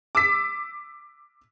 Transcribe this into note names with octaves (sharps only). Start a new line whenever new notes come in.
D6 E6 B6